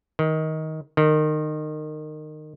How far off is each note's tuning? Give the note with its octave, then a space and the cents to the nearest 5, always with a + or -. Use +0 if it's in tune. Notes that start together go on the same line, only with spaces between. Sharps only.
D#3 +15
D#3 -25